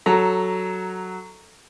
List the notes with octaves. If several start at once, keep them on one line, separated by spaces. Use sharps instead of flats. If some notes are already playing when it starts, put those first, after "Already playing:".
F#3 A4 A#5